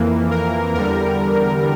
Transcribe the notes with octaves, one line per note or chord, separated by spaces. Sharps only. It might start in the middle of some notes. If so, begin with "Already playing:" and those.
Already playing: F2 E3 A#3
A#4
E2 D3 G3 A#4